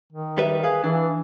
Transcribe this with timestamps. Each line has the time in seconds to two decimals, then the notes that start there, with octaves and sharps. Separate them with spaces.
0.13 D#3
0.38 G3 B4 E5
0.64 G#4 B4 F5
0.84 E3 D4